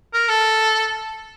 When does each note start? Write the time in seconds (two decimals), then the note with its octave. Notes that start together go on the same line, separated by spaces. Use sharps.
0.14 A#4
0.28 A4